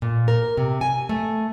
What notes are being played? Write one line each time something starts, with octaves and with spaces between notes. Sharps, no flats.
A#2
A#4
C3
G#5
A3